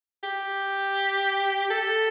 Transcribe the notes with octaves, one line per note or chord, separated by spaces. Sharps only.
G4
A4